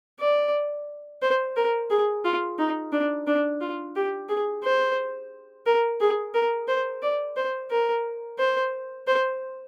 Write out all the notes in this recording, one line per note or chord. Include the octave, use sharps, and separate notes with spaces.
D5
C5
A#4
G#4
F4
D#4
D4
D4
F4
G4
G#4
C5
A#4
G#4
A#4
C5
D5
C5
A#4
C5
C5